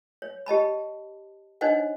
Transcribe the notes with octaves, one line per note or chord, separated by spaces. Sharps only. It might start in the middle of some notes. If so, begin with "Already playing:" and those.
C#5
G4 D#5 A5 B5
D4 D#4 C5 C#5 D#5 F#5